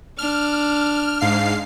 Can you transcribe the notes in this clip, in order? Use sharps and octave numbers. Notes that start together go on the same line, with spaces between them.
D4 F6
G#2 F5 C7